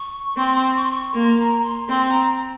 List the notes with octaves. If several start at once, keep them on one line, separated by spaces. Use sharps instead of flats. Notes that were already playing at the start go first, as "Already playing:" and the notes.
Already playing: C#6
C4 C6
C#6
C6
C#6
A#3 C6
A#5
C6
C4 C6
A#5